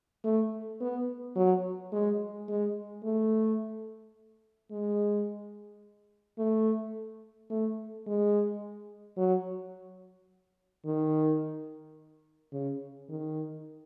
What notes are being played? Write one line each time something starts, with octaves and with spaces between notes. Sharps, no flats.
A3
B3
F#3
G#3
G#3
A3
G#3
A3
A3
G#3
F#3
D#3
C#3
D#3